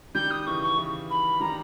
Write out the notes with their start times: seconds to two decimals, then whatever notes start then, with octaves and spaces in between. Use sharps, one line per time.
0.14 D#3 G3 G6
0.30 D#6
0.46 C#3 E3 C#6
0.62 C#6
0.78 C#3 E3
1.10 B5
1.40 D#3 G3 A#5